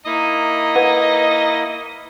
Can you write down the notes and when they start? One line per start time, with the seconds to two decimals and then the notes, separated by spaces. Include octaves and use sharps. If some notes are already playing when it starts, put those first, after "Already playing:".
0.06 A#3 D#4 E4 D#5
0.75 B4 F#5